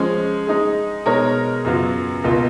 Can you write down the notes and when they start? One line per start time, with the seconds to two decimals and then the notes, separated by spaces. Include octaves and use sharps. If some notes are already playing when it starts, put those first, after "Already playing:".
Already playing: F3 G#3 C#4
0.47 G#3 D#4 G#4
1.06 B2 G#3 D#4 A#4 C#5
1.64 F#2 C#3 F#3 B3 F4
2.24 C#2 B2 A#3 F4